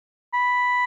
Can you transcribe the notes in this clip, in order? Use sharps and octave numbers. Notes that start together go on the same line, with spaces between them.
B5